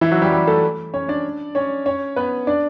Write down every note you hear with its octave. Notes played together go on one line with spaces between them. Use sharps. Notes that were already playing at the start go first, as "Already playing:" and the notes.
E3 E4
F#3 F#4
G3 G4
G3 G4
A3 A4
C#4 C#5
D4 D5
C#4 C#5
C#4 C#5
B3 B4
D4 D5